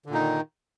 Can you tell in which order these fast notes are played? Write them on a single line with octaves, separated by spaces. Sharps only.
D3 A#2 D#4 D#3